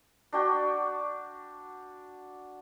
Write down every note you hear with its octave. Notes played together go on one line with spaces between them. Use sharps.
D4 F#4 G5